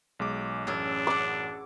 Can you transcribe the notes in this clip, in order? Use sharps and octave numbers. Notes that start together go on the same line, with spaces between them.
B1 G#3 D6
A1 F#2 C#4 D4 G#4 E6
F#5 C6 D6